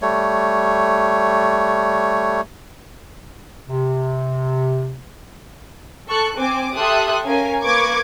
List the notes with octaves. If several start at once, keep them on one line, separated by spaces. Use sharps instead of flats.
G3 A3 C#5
C3
A4 C#6 F#6
C4 G#5 D6
G4 A4 E5 C6 D#6 F#6
C#4 A#4 F5 G#5
A#3 B4 C#6 D6 G#6